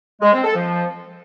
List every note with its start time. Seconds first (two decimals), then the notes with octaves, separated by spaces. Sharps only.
0.22 G#3
0.33 C4
0.44 A4
0.55 F3